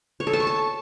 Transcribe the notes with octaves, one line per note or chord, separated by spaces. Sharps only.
C#5
A4
A5
C#6
A5